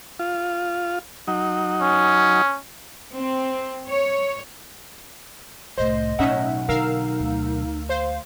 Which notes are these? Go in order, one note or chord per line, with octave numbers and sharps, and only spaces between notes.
F4
F#3 D#4
C#4
C4
C#5
C2 A2 C5 D#5
B1 A2 C#4 D#4 E5 F#5
D3 D#4 A#4 F5 E6
D2
C5 F5